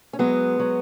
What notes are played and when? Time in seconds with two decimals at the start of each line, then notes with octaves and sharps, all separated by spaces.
0.13 C#4
0.19 F#3 G#3 B3
0.59 F#3